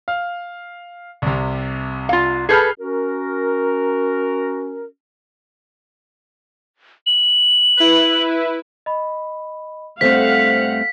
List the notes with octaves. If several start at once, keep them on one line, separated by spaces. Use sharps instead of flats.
F5
C2 C3
F4 F5
G#4 A4 B4 F6 G6 C7
C#4 F#4 A#4
F#7
E4 B4
D#5 B5
G2 A3 C4 C5 F5 F#5 B6